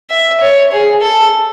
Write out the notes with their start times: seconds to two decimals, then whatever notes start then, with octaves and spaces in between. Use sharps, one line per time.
0.10 E5
0.41 C#5
0.72 G#4
1.02 A4